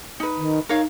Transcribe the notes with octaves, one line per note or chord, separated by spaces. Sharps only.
D#4 B4
D#3
D#4 A#4 C#5 F5